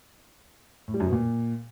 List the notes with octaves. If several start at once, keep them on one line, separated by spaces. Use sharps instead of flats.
A2
G3
F#2
B2
A#2